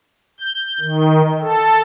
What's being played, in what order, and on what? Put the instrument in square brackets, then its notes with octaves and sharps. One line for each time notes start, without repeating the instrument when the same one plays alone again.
[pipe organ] G6
D#3
A4